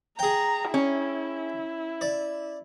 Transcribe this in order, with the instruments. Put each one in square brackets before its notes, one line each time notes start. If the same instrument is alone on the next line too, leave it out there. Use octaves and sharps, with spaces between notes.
[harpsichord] G#4 G5 [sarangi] A#5
[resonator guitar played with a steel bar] C#4 [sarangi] E4
[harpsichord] D5